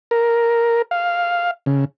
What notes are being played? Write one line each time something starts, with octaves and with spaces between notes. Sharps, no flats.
A#4
F5
C#3